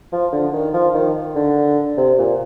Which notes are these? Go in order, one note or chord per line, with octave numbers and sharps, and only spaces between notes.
F3
D3
D#3
F3
D#3
D3
C3
A#2